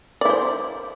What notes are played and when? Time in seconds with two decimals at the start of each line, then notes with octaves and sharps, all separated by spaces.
0.21 D5
0.25 E4
0.29 C5